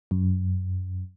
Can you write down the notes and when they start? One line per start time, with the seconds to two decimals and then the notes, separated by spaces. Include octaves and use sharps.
0.11 F#2